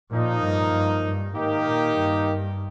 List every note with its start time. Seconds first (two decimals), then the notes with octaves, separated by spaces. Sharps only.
0.11 A#2 F3 A#3 D#4
0.43 G2
0.73 G2
1.05 G2
1.34 G#2 D#3 A#3 D#4 G4
1.66 A#2
1.96 G2